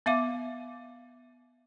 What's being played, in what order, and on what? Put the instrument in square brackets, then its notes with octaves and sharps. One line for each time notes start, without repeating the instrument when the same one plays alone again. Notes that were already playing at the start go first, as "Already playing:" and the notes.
[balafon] B3 E5 F5 D6